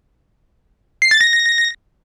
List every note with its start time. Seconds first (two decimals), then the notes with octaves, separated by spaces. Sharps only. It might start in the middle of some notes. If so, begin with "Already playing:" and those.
1.02 C7
1.11 A6
1.21 A#6